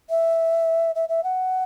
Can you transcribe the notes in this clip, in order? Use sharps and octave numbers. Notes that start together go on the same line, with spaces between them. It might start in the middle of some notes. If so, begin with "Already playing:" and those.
E5
E5
E5
F#5